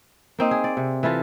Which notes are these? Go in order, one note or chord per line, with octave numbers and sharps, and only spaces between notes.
A#3 C4 D#4
G#4
D5
C3
E3 E4 F4 A4